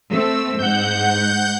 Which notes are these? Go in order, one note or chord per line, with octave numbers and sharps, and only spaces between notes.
A3 C4 E6
G#2 F#5 G6